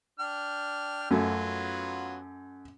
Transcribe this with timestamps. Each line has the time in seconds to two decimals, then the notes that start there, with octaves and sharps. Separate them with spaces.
0.19 D4 G5 F6
1.11 F#2 F#3 A3 B3 F4